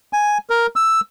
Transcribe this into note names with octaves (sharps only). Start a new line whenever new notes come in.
G#5
A#4
E6